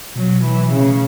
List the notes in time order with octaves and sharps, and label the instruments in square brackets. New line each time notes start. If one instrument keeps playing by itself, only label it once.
[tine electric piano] B2 [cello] F#3
[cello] E3
[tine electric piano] A3
[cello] C#3